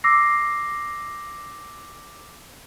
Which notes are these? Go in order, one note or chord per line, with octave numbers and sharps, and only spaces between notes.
D6 E6 A#6 C7